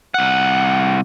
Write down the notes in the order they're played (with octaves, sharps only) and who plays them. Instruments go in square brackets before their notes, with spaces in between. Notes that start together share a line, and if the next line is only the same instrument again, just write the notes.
[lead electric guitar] C2 F#5